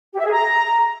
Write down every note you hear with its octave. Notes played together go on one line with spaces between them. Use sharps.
G4
E5
G#4
A#5